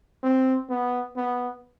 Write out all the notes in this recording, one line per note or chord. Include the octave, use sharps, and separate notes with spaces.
C4
B3
B3